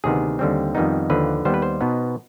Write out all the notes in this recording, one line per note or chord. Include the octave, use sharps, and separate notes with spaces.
D2 C3 D#3 B3 G#4
D#2 D3 G3 C4
F2 D#3 G3 B3 D#4
D#2 D3 F3 B4
D#2 D#3 G3 B3 C5
B4
C5
B2 B3 D#4